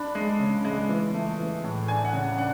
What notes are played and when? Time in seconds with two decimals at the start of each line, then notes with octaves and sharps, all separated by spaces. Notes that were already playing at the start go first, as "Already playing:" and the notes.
Already playing: D4 B5
0.15 G#3
0.40 C#3
0.65 G#3
0.89 E3
1.14 A3
1.39 E3
1.64 A2
1.88 D4 G#5
2.04 F#5
2.13 C#3
2.38 D4 F#5